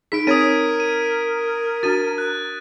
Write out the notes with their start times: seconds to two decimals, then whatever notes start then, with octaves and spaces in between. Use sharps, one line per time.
0.12 D#4 G#4 B6 D7
0.27 C4 A#4 C#5 D#6 G#6 D#7
0.80 D#7
1.83 D4 F#4 A6 D#7
2.18 F#6